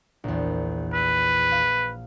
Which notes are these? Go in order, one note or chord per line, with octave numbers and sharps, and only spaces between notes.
A#1 E2
B4 E6
F5